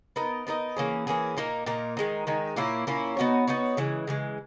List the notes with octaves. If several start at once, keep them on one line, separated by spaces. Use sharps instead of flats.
B3 D#4 A#4 D#5
B3 D#4 A#4 D#5
E3 A#3 C#4 G#4
E3 A#3 C#4 G#4
A#2 A#3 D#4 A#4
A#2 A#3 D#4 A#4
D#3 G#3 D#4
D#3 G#3 D#4
A#2 A#3 C#4 E4
A#2 A#3 C#4 E4
B3 D#4 F#4 C#5
B3 D#4 F#4 C#5
C#3 E3 G#3
C#3 E3 G#3